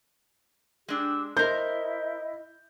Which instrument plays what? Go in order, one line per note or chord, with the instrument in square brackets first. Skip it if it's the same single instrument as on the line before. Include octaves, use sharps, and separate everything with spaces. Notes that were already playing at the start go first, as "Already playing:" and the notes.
[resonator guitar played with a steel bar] G#3 D4 [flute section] G4 E6
[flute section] E4 D#5 [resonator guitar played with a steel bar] A#4 C5 [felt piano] G6